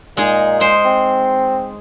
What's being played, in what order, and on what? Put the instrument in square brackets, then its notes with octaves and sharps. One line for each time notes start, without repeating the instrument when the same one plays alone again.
[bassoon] A#2 [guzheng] G#3 D#4 G#4
[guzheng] G#3 C5
[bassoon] C4